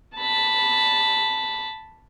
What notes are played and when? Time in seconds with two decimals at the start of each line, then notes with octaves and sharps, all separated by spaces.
0.17 A5 B5